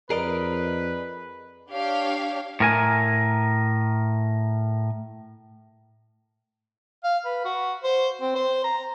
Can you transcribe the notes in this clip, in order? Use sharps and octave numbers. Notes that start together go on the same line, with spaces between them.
F2 G#4 A#4 B4 D5 D#5
D4 G4 C#5 F5
A2 A#4 G#5
F5
B4
F#4
C5
C4
C5
A#5